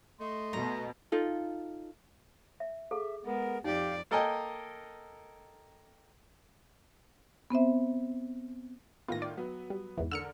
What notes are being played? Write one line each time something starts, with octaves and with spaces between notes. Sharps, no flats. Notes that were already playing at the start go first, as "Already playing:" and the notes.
A3 D#5 C6
B2 A#5
D#4 F4 A4
E5
G#4 A4 E5
G#3 B3 A#4
F2 D#4 G4 D5 F5
A#3 A4 A#4 D#5 G5 G#5
B3 C4 C5 E5
A2 D#3 B3 F4 A#6
D5
F#3 B3
G3
E2 G#2 E3
D3 A#4 E6 F6 C#7